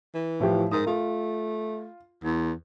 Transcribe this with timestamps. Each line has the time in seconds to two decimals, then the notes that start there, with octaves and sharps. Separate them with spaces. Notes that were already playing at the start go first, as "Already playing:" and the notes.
0.14 E3
0.40 A2 F3 G4
0.72 G#2 A#4 D#6
0.87 A3 F4
2.24 E2